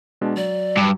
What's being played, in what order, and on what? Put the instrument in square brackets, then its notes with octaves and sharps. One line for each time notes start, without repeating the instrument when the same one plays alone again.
[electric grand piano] B2 G#3 D4
[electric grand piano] F#3 [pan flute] D5
[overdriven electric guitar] G2